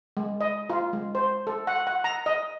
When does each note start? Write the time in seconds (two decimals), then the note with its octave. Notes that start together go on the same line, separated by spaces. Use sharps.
0.17 G#3
0.41 D#5
0.70 F4
0.93 G#3
1.15 C5
1.47 A4
1.67 F#5
1.87 F#5
2.04 A#5
2.26 D#5